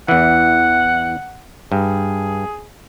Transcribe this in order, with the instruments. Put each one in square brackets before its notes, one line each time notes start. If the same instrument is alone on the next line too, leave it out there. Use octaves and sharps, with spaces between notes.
[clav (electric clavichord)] E2 E3 [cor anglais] F#5
[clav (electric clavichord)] G2 [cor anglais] G#4